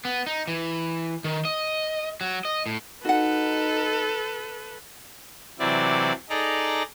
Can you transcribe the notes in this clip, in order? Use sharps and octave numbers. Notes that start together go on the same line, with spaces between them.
B3
D#4
E3
D#3
D#5
F#3
D#5
A2
D#4 F#4 A4 B4 F#5
C3 E3 F#3 E4 D5
D#4 G#4 A4 D5 A#5